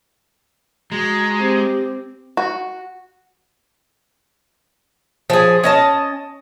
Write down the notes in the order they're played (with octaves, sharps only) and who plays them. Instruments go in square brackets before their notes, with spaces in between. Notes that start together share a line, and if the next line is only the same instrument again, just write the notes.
[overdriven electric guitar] G#3 [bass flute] F#4 [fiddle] A#5
[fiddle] C4 [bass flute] G4
[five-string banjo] F#4
[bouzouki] F3 G#4
C#4 D#5 A5